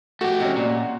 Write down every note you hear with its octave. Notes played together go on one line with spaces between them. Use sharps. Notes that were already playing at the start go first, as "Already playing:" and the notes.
A3 F#4 G4
C3 C#4 D#5
A#2 D5